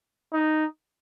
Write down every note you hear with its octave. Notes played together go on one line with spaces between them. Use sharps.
D#4